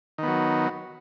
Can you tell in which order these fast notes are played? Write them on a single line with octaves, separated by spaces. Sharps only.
D#3 B3 F#3